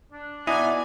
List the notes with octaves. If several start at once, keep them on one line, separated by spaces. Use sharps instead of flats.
D4
B2 B3 D#4 E4 D5 G#5